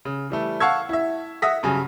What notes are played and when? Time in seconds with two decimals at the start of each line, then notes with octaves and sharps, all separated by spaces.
0.05 C#3
0.30 E3 G3 A3
0.60 F5 F#5 A5 C#6 E6 G#6
0.89 E4 E5
1.42 E5 F#5 D#6 A#6 B6
1.63 G2 C#3 F#3 G#5